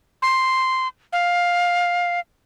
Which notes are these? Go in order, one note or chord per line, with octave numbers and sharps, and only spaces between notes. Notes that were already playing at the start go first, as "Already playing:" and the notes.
C6
F5